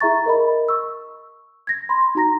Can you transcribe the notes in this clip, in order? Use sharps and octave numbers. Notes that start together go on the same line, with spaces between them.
E4 G#4 E5 A#5 C#6 A6
A#4 D#5 B5
C#6 E6
G#6 A#6
B5 C6
D#4 F#4 A#5 A#6